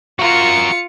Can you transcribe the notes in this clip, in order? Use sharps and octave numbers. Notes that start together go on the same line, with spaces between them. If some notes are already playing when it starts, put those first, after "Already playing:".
F4 F#4 A#4 C#7